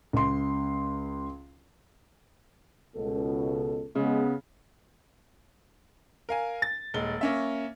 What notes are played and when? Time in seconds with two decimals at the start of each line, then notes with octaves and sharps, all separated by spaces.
0.13 C#2 C6
2.96 C#2 B2 A4
3.95 C#3 G#3 B3
6.29 A#4 F5 G#5
6.62 A6
6.94 D#1 G#3 G7
7.21 A#3 C#4 E5